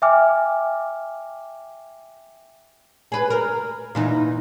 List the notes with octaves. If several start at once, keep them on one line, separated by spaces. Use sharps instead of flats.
E5 G5 G#5 D6 F6
G#4 B4
A#4
A#2 E3 D#4